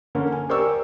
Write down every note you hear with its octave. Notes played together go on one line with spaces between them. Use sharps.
D3 A#3 C#4
G#5
G4 A#4 C5 D5 C#6 E6